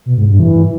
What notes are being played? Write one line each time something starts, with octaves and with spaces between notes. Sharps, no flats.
B2
G#2
G2
E3